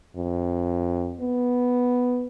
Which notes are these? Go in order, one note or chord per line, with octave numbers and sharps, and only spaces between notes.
F2
B3